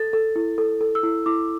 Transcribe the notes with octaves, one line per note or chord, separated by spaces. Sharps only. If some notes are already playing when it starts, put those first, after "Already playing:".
Already playing: A4 A6
A4
E4
A4
A4
E6
E4
E4 D6